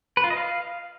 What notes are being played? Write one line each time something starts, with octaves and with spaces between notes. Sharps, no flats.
B4
F4
D#5
F5